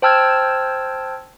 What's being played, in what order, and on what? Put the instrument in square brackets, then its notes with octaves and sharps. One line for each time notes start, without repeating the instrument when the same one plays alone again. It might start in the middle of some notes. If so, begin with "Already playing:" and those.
[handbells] C5 G5 A5 E6 F6 G#6